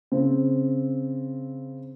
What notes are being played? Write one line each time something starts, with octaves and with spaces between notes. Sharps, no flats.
C#3 C4